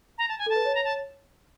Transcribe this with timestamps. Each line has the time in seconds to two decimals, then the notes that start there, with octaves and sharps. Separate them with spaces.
0.18 A#5
0.29 A5
0.39 G#5
0.46 A4 A5
0.56 B4
0.65 C#5
0.75 A#5
0.84 A5